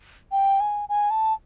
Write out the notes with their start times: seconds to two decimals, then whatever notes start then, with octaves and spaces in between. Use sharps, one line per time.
0.32 G5
0.60 G#5
0.89 G#5
1.10 A5